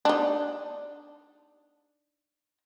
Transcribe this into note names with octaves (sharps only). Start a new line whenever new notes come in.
D4 D#4